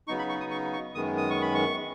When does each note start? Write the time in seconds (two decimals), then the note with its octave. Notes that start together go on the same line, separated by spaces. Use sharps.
0.08 C#3 F#3 B3 D#4 C#6
0.19 B5
0.29 C#6
0.40 D#6
0.51 C#6
0.73 C#6
0.95 F#2 D#3 G#3 B3 D#6
1.17 D#6
1.30 C#6
1.42 B5
1.54 C#6